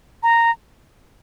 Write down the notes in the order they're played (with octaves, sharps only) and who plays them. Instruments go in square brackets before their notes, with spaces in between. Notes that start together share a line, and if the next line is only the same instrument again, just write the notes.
[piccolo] A#5